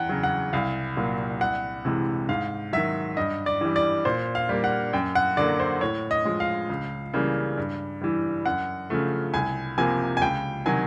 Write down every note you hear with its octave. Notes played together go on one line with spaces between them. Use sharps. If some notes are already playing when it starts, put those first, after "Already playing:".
Already playing: E2 F#5 G5
C#3 F#3
F#5
C2 F5
A#2 F#3 A#3
C2 F#5
C3 E3 G#3
G#2 F5
D#3 F#3 E5
G2 D#5
D5
E3 G3
D5
A#2 C5
F5
G3 A#3
F#5
F#2 G5
F#5
D3 F#3 A#3 D5
C5
A2 C#5
D#5
F3 G#3
F5
C#2
C#3 E3 G3 A#3
G2
E3 G3
F#2 F#5
C#3 F3 A3
C2 G#5
C3 F3 A#3 G#5
G#5
C#2 G5
C3 D#3 F#3 G#5